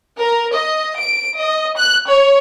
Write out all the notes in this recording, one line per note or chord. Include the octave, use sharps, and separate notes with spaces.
A#4
D#5
D7
D#5
F#6
C#5